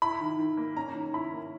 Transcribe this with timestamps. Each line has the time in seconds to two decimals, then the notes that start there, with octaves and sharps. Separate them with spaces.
0.02 E4 B5
0.21 D#3
0.39 D#3
0.57 A#3
0.77 C#4 A#5
0.95 D#3
1.14 E4 B5
1.32 A#3